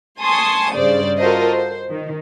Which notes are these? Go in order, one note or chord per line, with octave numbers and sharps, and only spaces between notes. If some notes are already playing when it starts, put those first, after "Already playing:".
G#5 A5 C6 C#6 D#6
G2 C#3 C5 D5
F4 F#4 A4 A#4 C5 D#5
C5
D#3